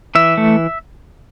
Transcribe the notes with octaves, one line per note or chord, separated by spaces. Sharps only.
E3 E5
A3